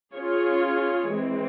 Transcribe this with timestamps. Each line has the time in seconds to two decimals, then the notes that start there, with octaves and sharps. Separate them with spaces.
0.16 C#4 F4 G#4 C#5
1.10 E3 G#3 C4